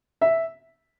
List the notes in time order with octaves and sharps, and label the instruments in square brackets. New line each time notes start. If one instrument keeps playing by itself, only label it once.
[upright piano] E5